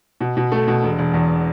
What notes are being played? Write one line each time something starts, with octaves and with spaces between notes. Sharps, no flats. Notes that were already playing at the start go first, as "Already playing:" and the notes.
B2
B2
A3
B2
E1
E1
E2